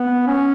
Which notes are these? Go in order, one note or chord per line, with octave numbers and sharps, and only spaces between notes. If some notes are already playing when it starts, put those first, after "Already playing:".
Already playing: B3
C#4